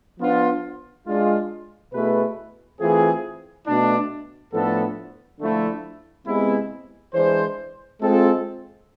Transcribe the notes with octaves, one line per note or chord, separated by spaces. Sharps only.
F3 B3 D4 F4
G#3 D4 F4
B2 A3 E4 G#4 B4
E3 A3 C4 F4 G#4
B2 A3 D4
A2 F3 B3 D4 A4
D3 F3 A3 E4
C3 G#3 B3 E4
E3 G#3 D4 G#4 C5
G#3 C4 F4 A4